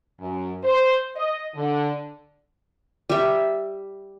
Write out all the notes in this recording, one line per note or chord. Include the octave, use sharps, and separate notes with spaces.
F#2
C5
D#5
D3
G3 E5